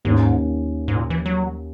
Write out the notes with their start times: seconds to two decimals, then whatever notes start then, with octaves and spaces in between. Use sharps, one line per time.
0.05 D#2 G#2 D#3 A#3 C#4
0.88 G#2
0.95 A#2
1.10 E3
1.26 F#3